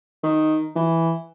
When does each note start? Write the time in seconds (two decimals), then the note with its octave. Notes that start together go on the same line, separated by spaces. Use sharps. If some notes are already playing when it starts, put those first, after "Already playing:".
0.23 D#3
0.76 E3